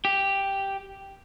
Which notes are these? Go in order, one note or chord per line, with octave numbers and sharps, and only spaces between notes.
G4